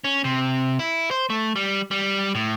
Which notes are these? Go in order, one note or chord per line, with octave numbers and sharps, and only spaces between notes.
C#4
C3
E4
C5
A3
G3
G3
A2